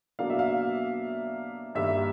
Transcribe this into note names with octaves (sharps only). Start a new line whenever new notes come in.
B2 F#3 A#3 D4 F5
E5
F5
G2 D#3 G3 A#3 E5